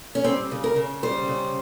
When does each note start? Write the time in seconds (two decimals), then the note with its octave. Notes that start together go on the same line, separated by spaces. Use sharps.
0.15 C#4
0.24 G3 C4
0.51 C#3
0.64 A#4
0.76 C#3
1.03 G3 C5
1.28 C#3